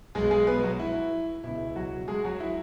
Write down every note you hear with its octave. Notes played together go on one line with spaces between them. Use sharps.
B1 B2 G#3 G#4
G#3 G#4
B3 B4
F#3 F#4
E4
C#2 B2 E4
F#3 F#4
G#3 G#4
F#3 F#4
E4